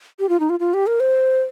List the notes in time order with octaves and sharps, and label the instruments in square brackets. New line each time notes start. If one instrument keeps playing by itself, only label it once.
[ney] G4
F4
D#4
F4
F4
G4
A#4
C5